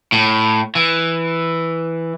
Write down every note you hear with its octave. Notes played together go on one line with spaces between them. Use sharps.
A2
E3